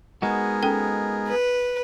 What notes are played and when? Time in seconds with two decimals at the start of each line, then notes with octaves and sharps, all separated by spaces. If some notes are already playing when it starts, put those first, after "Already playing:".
0.22 G#3 B3 D#4 F#4 G#4 A#4
0.63 C#4 A4 G5
1.28 B4